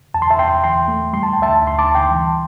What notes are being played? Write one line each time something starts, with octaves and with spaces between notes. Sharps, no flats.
E2 A5
C6
E5 A5
E2 G5 C6
E3 G5 C6
A3
G3 C6
A5
G5
D2 E5 A5
D2 C6
A5 D6
D2
G5 C6
E3